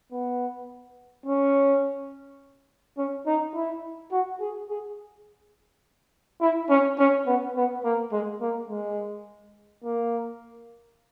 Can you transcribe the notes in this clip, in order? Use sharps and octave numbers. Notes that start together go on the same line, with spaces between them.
B3
C#4
C#4
D#4
E4
F#4
G#4
G#4
E4
C#4
C#4
B3
B3
A#3
G#3
A#3
G#3
A#3